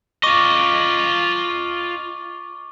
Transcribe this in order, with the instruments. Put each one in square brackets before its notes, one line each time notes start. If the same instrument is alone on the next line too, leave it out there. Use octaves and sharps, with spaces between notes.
[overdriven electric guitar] F4 D#5 [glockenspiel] C#6 D6 D#7